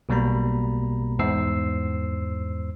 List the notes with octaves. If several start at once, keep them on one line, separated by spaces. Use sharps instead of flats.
B1 B2 G3 A#3 A#5 B5
E2 G#2 C5 E6 C7